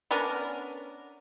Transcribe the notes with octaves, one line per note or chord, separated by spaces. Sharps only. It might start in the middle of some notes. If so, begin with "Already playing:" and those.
B3 C#4 D4 A#4